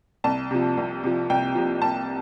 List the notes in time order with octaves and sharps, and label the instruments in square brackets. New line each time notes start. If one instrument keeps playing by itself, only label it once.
[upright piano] C2 A5
C3 F3
C2
C3 F3
C2 G5
C3 F3
C2 A5